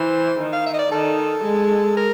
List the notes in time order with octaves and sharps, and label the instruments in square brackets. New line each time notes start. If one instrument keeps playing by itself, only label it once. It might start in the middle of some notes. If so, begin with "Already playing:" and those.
Already playing: [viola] E3 [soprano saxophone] C5
[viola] D#3
[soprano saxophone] F5
E5
D#5
D5
[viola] D#3 [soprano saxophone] A4
[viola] G#3
[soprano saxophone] A#4